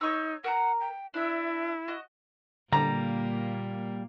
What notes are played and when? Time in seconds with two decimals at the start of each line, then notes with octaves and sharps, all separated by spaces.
0.01 D#4 C#5 C#6 E6
0.44 A#4 F#5 A#5
0.80 G5
1.14 D4 E4 E5
1.88 F#4 D#5
2.73 A#2 D3 G3 A#3 A#5